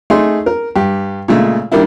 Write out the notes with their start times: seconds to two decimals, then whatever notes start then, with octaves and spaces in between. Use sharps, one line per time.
0.10 A3 D#4 G#4 C6
0.46 A#4
0.76 G2 G4
1.28 A#2 C#3 G#3 A3
1.72 D#3 G3 A#3 D4 E4